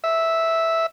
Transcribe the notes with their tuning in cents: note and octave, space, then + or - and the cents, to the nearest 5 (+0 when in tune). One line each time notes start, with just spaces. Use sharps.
E5 -5